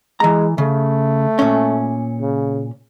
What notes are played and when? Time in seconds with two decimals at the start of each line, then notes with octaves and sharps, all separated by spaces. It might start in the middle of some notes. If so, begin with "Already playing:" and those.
0.20 E3 G#3 A#5
0.58 C#3 A3
1.39 A#2 C#4
2.21 C#3